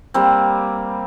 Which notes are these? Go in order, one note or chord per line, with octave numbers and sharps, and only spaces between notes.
G3 A#3 C4